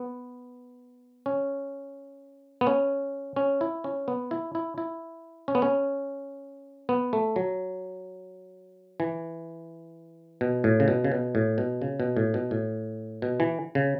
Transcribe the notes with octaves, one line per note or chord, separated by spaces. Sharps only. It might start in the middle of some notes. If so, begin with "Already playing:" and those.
Already playing: B3
C#4
B3
C#4
C#4
E4
C#4
B3
E4
E4
E4
C#4
B3
C#4
B3
A3
F#3
E3
B2
A2
C#3
B2
C#3
B2
A2
B2
C#3
B2
A2
B2
A2
B2
E3
C#3